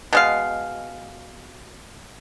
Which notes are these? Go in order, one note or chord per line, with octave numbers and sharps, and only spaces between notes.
B2 G#3 F5